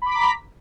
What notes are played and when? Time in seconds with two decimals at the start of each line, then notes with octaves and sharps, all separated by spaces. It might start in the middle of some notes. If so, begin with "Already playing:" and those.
0.02 B5
0.06 D6
0.11 B6
0.15 A#5